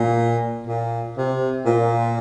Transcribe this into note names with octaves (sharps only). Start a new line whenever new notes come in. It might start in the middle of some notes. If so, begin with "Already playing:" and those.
Already playing: A#2
A#2
C3
A#2